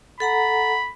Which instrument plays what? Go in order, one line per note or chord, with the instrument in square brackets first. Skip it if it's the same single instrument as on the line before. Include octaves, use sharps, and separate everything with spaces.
[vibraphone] A4 F#5 A#5 [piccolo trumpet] B5